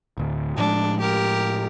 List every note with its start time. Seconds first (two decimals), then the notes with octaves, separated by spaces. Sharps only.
0.17 D1 D2
0.57 A2 F3 G#3 D4
1.00 G4 A#4